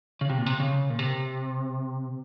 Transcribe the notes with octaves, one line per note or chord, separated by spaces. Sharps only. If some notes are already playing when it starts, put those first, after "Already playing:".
C#3
C3
A#2
C3
C#3
A#2
C3